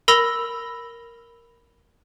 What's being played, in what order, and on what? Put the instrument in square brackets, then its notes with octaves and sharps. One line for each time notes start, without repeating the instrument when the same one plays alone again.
[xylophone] A#4 B5 E6 A#6 F7